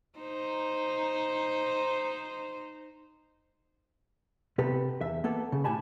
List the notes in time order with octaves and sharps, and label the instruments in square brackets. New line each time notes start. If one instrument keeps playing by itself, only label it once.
[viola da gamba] D#4 C5
[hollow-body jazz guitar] C3 B3 G4 A4 B4
E2 E5
A#3 B3 A4
C#3
A2 G4 G#5 A5 B5